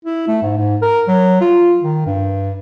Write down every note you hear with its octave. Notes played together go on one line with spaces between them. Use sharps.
E4
A3
G#2
G#2
A#4
F#3
F4
D#3
G2